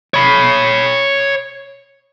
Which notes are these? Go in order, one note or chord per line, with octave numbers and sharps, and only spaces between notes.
C#5 B5